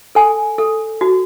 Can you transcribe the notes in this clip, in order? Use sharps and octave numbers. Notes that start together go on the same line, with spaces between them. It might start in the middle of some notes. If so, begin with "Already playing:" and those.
A4 G#5
A4
F#4